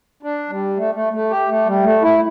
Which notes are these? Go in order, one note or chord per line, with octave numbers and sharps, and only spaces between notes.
D4
G3
A3
A3
A3
G4
A3
G3
A3
E4